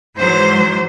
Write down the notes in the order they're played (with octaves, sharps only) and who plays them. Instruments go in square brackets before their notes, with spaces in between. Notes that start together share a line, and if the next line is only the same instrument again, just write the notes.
[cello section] G#2 E3 F#3 C5